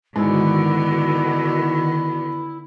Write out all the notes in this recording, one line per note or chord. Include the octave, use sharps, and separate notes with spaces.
G#2 D3 D#3 B3 E4 F#4